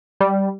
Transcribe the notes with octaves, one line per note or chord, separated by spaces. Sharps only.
G3